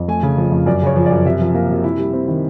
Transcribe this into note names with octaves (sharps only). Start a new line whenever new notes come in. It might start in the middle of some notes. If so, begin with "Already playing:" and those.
Already playing: F2
A3 G#5
C#3
F3
F2
F#2 D5
C#3 C#5
F3
F#2 D5
C3 E5
F3
A#3
C3
E4
G3
C4
D#3